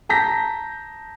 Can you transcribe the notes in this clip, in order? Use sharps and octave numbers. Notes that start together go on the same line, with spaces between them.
A5 A#5 G6 A#6 B6